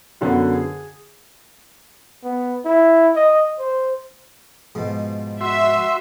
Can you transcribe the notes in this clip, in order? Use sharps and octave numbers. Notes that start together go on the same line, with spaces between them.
F#2 D3 F#3 B3
G#4
B3
E4
D#5
C5
G#2 B2 F3
F#4 E5 C6 E6